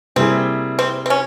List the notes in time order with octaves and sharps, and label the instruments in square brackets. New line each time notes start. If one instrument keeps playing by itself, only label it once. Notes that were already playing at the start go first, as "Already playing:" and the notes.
[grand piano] C3 G3 A#3 E4 G#4 [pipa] C4
[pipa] C4
C4
C#4